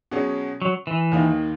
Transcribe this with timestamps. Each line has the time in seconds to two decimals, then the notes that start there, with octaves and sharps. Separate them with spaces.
0.11 B2 F#3 C#4 G#4
0.62 F#3
0.87 E3
1.12 D#2 D#3 A#3 D#4